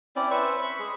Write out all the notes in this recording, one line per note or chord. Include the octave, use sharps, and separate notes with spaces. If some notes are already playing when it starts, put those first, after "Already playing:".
C4 C#4 E4 D5
B4 C5 E5 C#6
B5 C#6
G#3 G#4